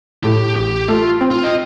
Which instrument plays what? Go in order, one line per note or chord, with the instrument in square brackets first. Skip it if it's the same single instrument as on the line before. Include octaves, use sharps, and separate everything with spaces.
[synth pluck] A2 [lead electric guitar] G4
[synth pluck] A1 [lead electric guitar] G4
[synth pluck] A3 [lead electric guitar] F4
[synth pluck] C4
[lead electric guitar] F4
D#5